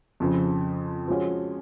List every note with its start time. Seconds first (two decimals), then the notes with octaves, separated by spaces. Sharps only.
0.20 F2 C#3 F3
1.08 F3 G#3 C#4 F#4